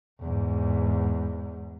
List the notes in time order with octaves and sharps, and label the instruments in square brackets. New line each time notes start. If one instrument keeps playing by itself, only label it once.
[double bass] E2 G#2